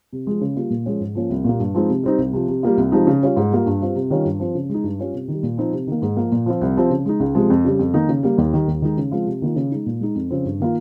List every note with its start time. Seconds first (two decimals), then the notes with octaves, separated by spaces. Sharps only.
0.13 C3
0.27 F3 G#3
0.41 C#3
0.56 G3 A#3 F4
0.70 A#2
0.86 F3 G#3 C#4
1.00 G#2
1.15 F3 A#3 C#4 F4
1.30 C2
1.44 A#2 G3 A#3
1.60 G2
1.74 F3 G#3 C4 D#4
1.90 C3
2.03 G3 C4 D#4
2.18 C2
2.33 C3 F3
2.48 C3
2.63 G3 A#3 F4
2.77 C2
2.92 C3 F3 G#3 D#4
3.07 C#3
3.22 G3 C#4 F4
3.36 G#2
3.51 G3 A#3 F4
3.66 G2
3.81 G3 C4 F4
3.96 C3
4.10 D#3 G3 C#4 F4
4.25 G2
4.40 F3 C4
4.55 C#3
4.69 G#3 D#4
4.84 G2
4.99 G3 C#4 F4
5.14 C3
5.28 D#3 G3
5.43 A#2
5.57 F3 C4 D#4
5.72 C3
5.87 D#3 A#3
6.02 G#2
6.17 F3 A#3
6.32 A#2
6.46 F3 C4 F4
6.61 C2
6.76 C3 F3 C4
6.90 C#3
7.06 G#3 D#4
7.20 C#2
7.35 C3 F3 G#3
7.50 F2
7.65 C#3 G3
7.79 F2
7.94 D#3 A#3 D#4
8.09 C#3
8.23 G3 A#3
8.38 D#2
8.53 D#3 G3
8.68 D#2
8.82 D#3 G#3 D#4
8.97 C#3
9.12 F3 G#3 C4 F4
9.27 C3
9.42 D#3 A#3 F4
9.56 C#3
9.71 G#3 D#4
9.86 A#2
10.01 G#3 D#4
10.15 F2
10.30 C#3 F3 C4
10.45 G2
10.60 D#3 A#3 F4